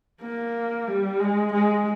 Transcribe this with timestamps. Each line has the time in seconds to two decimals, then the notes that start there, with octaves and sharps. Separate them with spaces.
0.22 A#3
0.88 G3
1.20 G#3
1.54 G#3